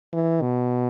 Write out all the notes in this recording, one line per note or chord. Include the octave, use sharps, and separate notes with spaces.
E3
B2